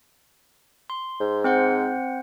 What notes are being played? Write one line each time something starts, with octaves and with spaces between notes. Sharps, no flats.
C6
G#2
C4 C5 F#5